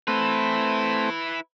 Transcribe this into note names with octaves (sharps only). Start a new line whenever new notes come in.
A3 C4 E4 B4